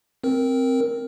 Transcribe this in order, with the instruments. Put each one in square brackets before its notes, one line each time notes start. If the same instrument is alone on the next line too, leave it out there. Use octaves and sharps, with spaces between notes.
[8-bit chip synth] C4 A#4